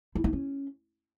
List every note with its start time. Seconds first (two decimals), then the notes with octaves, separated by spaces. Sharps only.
0.15 E4
0.24 D#4
0.33 C#4